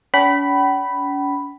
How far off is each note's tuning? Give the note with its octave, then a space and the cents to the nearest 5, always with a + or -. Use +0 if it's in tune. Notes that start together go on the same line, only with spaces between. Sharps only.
C#4 +45 G5 -45 B5 +0